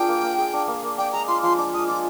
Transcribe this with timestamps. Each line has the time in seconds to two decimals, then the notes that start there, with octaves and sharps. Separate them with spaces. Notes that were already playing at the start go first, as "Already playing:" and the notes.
Already playing: D4 F4 G#4 A#4 F5 G5
0.08 A#3
0.23 A#3
0.38 G#4
0.53 D4
0.67 A#3
0.83 A#3
0.98 D4 G5
1.12 G#3 A#5
1.28 F4 C6
1.43 F3 C6
1.58 D4 D6
1.74 G#3 D#6
1.88 F4 D6